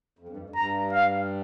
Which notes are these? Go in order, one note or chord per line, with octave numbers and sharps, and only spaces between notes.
F2
G2
F2
F2
G2 A#5
F5